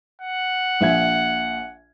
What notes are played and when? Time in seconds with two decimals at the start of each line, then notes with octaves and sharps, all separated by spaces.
0.22 F#5
0.81 A#1 E5 G#6